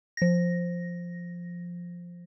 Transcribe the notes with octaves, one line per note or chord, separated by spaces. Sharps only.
F3 A#6